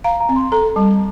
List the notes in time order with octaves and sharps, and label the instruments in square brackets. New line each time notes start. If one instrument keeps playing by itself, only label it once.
[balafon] F5 [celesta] A#5
[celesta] A#5
[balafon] C4
[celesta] C6
[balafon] A4 [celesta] A#5
[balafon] G3 [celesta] A5